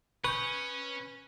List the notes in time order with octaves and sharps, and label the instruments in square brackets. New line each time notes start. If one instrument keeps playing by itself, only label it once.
[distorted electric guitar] C#4 [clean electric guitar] B4 [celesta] C#6 G6 [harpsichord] D#6